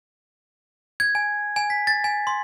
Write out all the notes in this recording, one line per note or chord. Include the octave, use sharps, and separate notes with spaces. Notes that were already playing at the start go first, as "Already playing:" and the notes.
G#6
G#5
G#5
B6
A6
G#5
C6